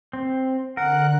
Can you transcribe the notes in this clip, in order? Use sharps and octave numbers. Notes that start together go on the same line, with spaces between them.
C4
D3 A#4 F#5 F#6